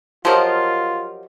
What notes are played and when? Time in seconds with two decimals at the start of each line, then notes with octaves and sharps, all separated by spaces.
0.25 F3 F#3 F4 G4 A#4 D#5